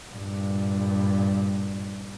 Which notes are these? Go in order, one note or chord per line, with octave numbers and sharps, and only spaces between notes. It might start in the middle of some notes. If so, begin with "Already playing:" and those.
G2 A#2